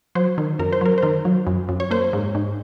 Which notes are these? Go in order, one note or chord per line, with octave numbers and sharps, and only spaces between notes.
F#3 C5
D#3
F#2 A#4
C5
F#3 A#4
C5
D#3 A#4
F#3
F#2
F#2
C#5
A#3 C5
G#2
G#2